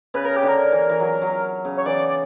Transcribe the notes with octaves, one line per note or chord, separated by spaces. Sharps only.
C#3 B4
A#4
G4
D3
A#4
E3
E3
F#3
F#3
C#3
C#5
E3 D5
D5